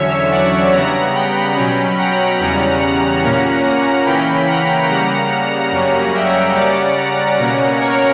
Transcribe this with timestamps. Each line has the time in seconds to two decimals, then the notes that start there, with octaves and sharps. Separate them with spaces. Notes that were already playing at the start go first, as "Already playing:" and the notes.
Already playing: E2 D3 F#3 C#4 C#5 E5
0.31 D5 F#5
0.73 C#3 G3 B3 F#5 A#5
1.15 G5 B5
1.56 B2 F#3 C#4
1.98 F#5 A#5
2.39 E2 C#3 G3 C#4 F#5 A#5
2.81 F#5 A#5
3.23 A#2 A#3 C#4
3.64 F#5 A#5
4.05 C#3 E3 A#3 C#4 G5 B5
4.48 F#5 A#5
4.89 C#3 G3 A#3 F#5 A#5
5.72 F#2 C#3 G3 A#3 C#4
6.14 E5 G5
6.55 C#3 G3 C#4 D5 F#5
6.97 F#5 A#5
7.39 B2 A#3 C#4
7.80 A#4 C#5